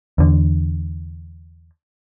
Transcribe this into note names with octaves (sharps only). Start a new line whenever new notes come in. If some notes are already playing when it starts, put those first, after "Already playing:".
E2 D3